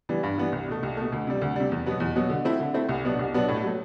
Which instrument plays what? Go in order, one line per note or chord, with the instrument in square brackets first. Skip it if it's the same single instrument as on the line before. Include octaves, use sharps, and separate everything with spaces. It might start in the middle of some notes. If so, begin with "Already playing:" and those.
[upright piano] E3 G3 B3
G2
E3 G3 B3
C2
B2 A3
C2
B2 A3
D2
C3 G3
D2
C3 G3
E2
B2 F#3 B3
E2
B2 F#3 B3
D3
A3 C4 E4
D3
A3 C4 E4
C2
B2 F#3 B3 D4
C2
B2 F#3 B3 D4
A2
F#3 A3